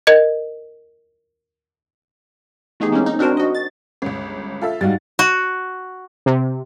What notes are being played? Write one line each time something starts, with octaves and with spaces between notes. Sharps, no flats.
A#4 D#5 G#6
E3 A3 B3 D#4 G4 G#4
G#3 A#3 C4 C#4 D#4
D#4
C4 D4 F#4 A#4 C5
F#4 D#5
A6
G1 C#2
F4 A4 E5
G#2 G3 F#4 F5 A6
F#4
C3